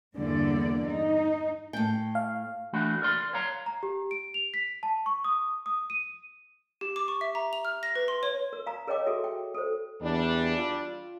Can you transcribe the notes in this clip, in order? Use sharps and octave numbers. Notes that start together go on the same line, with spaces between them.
E2 G2 D3 A#3 D5
D#4
A2 G5
F5
E3 A3 D4 E4 F#4
A#4 D5 C6
C#5 F5 A#5
A#5
G4
D7
F7
B6
A5
C#6
D#6
D#6
D#7
G4
D6
C#6
E5
A#5
F7
F6
A#6
B4
C6
C#5
A#4
F5 A#5
G#4 A#4 C#5 D#5 G5 D6
F#4 G#4 A4 E5
G5
A4 C5
E2 G3 D4
F4